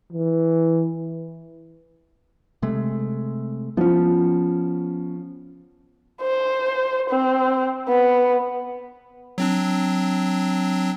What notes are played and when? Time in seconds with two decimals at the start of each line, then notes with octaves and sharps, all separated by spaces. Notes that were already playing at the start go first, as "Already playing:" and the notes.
0.13 E3
2.63 C3 G#3 A3
3.77 F3 B3 C#4
6.21 C5
7.10 C4
7.88 B3
9.38 F#3 C4 D4